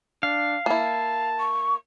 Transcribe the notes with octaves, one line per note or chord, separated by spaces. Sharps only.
D4 F5
A#3 E4 A5
C#6